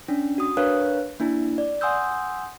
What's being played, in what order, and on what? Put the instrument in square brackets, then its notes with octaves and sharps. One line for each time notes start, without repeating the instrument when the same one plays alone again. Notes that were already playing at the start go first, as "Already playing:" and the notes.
[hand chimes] C#4 D4
F#4 D#6
D4 A#4 B4 C#5 F5 F#6
A#3 D4 E4
D5
F#5 G#5 C6 D#6 E6 G6